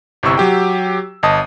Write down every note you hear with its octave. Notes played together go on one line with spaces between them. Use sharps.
G1 C3 E4 C#6 E6
F#3 G4 G5
G1 D#5 A5 D#6